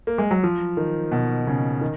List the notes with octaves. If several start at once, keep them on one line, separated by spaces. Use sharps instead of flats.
A#3
G#3
F#3
F3
D#3
B2
C#3
D#3